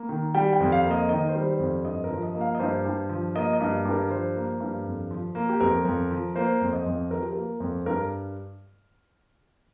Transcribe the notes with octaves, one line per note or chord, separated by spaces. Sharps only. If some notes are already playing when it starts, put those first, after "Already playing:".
Already playing: A#3
D#3
G3 G5
G5
F2
F5
A#3
D#5
D#3 D#5
C5
G3
C5
F2
G2 D#5
A#4
F3
D#5
A#3
F5
D#5
G2 C5
G2
F3
A#3 D#5
D#5
G2
G2
A#4
F3 C5
A#3
G2
F2
F3
A#3
G4
F2 A#4
F2
F3
A#3 C5
F2
D#5
F2
F3 A#4
G4
A#3 A#4
F2
G2 A#4